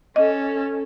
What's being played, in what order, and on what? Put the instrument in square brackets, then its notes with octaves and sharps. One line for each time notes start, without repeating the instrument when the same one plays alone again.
[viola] C#4 A4 [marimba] D#5